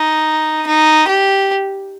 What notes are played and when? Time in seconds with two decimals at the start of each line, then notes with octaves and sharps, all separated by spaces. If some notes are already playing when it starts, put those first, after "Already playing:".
Already playing: D#4
0.67 D#4
1.09 G4